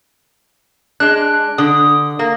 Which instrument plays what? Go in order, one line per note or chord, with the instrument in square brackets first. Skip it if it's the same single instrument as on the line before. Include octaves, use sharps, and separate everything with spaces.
[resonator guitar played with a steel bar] G#3 D4 [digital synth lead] F#6
[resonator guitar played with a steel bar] D3 [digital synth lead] D#6
[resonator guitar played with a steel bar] A#3